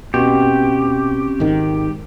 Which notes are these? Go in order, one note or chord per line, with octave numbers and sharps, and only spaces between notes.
B2 C4 C#4 G4
G#1 G#2 D#3